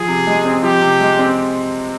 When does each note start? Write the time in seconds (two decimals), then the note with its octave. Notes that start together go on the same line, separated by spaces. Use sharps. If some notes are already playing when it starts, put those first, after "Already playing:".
Already playing: F3 G#4
0.08 C3
0.27 G#3
0.45 C4
0.63 F3 G4
0.81 C3
1.00 G#3
1.19 C4